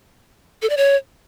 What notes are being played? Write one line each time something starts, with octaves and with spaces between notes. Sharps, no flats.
A4
D5
C#5